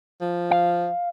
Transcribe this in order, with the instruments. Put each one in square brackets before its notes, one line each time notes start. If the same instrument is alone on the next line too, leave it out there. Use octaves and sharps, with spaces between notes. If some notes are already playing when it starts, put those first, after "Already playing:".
[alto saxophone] F3
[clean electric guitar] F5